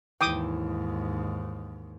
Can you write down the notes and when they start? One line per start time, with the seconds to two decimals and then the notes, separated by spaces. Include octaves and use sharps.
0.21 D#2 G#2 E3 E4 G5 D6 D#6